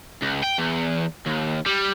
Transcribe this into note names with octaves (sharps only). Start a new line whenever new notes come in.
C#2
G5
E2
D#2
G3